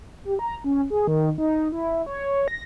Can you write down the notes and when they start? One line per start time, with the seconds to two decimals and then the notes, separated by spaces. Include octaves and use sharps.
0.25 G4
0.39 A#5
0.64 C#4
0.90 G#4
1.07 D#3
1.38 D#4
1.72 E4
2.06 C#5
2.48 A#6